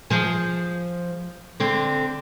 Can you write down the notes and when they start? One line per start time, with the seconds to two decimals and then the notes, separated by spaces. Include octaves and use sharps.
0.10 F3 G#4
1.60 D3 C4